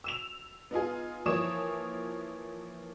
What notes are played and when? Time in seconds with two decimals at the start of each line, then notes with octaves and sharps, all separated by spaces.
0.04 E6 E7 F7
0.71 B3 D#4 F4 G#4
1.26 E3 F3 A#3 C#5 D#6 E7